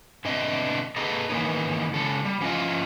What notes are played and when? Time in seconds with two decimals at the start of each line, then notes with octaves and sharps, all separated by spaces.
0.25 B2 D3 C4 D4 D#5 E5
0.96 G#4 A4 B4 D#5 A#5
1.29 D#3 E3 A#3 B3 C#4 D#4
1.94 C#3 G#3 A4
2.25 G3
2.41 F3 C#4 E4 F4 D#5